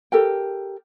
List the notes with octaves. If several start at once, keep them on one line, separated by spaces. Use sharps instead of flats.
G4 A4 A#4 G5